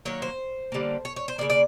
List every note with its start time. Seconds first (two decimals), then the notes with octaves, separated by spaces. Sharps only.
0.05 D#3 F#3 A#3 C#5
0.22 C5
0.72 D3 G3 A#3
1.05 C#5
1.16 C#5
1.28 C5
1.38 C#3 F3 A#3 D5
1.50 D5